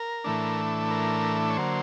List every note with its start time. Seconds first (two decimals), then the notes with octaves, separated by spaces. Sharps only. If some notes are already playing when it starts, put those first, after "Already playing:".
Already playing: A#4
0.24 A2 E3 A3 D4
0.91 A#4
1.50 C#5
1.57 D3 F#3 A#3 C5